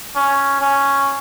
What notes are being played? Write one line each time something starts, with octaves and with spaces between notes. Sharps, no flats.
C#4
C#4